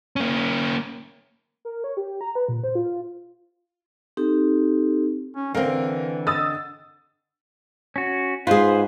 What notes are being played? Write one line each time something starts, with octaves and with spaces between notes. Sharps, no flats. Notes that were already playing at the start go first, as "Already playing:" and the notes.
A#3 C#4
A#4
C#5
G4
A#5
B4
A#2
C5
F4
C4 D#4 G4 A4
C#4
D3 E3 C4 A#4 F5
D#5 D#6 E6 A6
C#4 F#4
G#2 F4 G#4 B4 C5